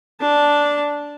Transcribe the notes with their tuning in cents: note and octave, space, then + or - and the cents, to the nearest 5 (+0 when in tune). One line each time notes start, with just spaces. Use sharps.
D4 -5 A5 +0